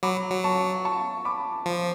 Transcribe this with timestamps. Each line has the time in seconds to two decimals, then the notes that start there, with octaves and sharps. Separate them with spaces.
0.03 F#3 B5 D6
0.31 F#3
0.44 A5 C#6
0.85 A5 C#6
1.25 B5 D6
1.66 F3